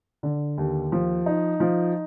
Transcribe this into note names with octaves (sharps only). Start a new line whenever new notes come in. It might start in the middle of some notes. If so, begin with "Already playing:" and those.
D3
D#2
F3
D#4
F3